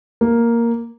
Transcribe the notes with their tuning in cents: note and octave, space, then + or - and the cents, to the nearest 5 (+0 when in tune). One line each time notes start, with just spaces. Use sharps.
A#3 +0